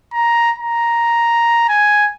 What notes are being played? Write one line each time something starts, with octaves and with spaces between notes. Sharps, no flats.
A#5
A#5
G#5